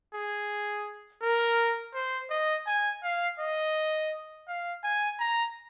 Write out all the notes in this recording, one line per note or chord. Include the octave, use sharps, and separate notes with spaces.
G#4
A#4
C5
D#5
G#5
F5
D#5
F5
G#5
A#5